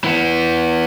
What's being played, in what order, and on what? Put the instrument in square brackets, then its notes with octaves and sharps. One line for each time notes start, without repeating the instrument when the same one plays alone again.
[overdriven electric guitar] E3 B3